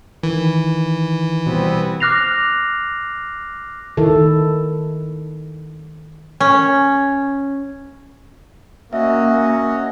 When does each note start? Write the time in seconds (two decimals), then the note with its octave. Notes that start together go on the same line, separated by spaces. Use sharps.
0.23 D#3 E3
1.47 B2 G3 B3 C4
2.00 D6 F6 F#6 A#6 C7 F7
3.97 D#3 E4 A4
6.40 C#4
8.93 A#3 C#4 F#4 D#5 E5